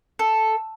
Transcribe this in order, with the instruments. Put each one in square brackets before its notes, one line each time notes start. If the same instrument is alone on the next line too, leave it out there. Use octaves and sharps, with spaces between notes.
[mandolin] A4